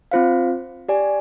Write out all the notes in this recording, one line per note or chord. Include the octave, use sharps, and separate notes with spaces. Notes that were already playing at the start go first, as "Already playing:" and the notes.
C4 F4 C5 F5
G4 D5 G#5